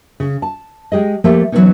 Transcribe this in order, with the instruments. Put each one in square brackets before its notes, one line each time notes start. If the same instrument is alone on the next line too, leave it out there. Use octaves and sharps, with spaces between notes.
[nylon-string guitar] C#3
A5
G#3 G4 G#4 D#5
F3 A3 A#3 G4 A4
E3 F#3 G3 B3 C#4 D#4